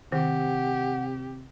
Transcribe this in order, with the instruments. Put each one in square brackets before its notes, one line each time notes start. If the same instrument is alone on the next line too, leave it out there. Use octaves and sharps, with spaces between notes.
[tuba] C3 [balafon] D#3 [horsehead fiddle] G4 [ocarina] F#5